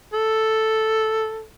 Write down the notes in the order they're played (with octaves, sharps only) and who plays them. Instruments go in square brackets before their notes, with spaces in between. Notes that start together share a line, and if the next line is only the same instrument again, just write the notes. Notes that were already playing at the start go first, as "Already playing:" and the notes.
[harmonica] A4